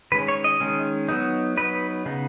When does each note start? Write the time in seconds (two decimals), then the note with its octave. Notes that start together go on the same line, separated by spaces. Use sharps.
0.12 D#3 G#3 C#4 B4
0.28 C#5
0.44 D#5
0.60 D#3 G#3 C#4
1.08 F#3 B3 D#4
1.57 F#3 B3 D#4 B4
2.06 C#3 B3 D#4